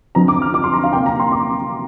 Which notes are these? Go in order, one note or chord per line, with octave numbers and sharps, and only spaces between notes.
D3 F3 C4 A#5
D6
F6
D6
C6
A#5
F5
C3 A#3 G5
A#5
C6
D6